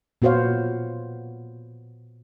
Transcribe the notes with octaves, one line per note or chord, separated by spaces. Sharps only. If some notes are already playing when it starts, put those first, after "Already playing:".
A#2 B3 F#4 C5 C#5 F5